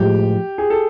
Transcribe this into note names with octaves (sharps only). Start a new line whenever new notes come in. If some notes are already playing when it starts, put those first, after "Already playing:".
Already playing: A2 F3 G#3 G4
G#4
A4